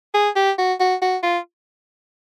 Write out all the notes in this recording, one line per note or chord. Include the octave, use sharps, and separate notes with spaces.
G#4
G4
F#4
F#4
F#4
F4